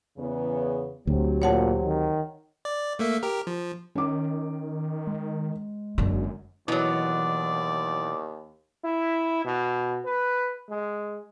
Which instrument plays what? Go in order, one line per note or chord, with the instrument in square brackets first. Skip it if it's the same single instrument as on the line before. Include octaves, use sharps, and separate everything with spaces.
[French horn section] E2 C#3 B3
[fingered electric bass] D2 [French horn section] F#3 C4 G4
[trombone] A#2 [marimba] C#5 F#5 A5
[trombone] D#3
[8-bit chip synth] D5
A3 A#3 E5
G4 A#4
F3
[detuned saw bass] D#3 [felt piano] C#4 D6
[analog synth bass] G#3
[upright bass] F#1 D3 [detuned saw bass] F#2
[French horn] D#2 [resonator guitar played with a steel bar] B2 F#3 [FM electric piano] E3 [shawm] D5
[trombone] E4
B2
B4
G#3